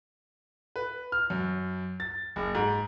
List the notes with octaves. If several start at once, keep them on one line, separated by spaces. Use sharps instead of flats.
B4
F6
F#2
A6
F#1
G#2